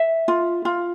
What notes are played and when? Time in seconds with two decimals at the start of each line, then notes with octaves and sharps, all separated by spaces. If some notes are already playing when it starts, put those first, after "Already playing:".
Already playing: E5
0.28 F4
0.65 F4